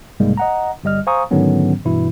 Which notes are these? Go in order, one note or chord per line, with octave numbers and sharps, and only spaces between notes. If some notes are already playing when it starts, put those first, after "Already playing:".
B1 G#2 C3 G3 G#3 A#3
D#5 F#5 A#5
G1 G3 D#5 F6
C5 F5 G#5 A#5 C#6 D#6
G#2 D3 D#3 F#3 B3 C#4
G2 B2 E3 E4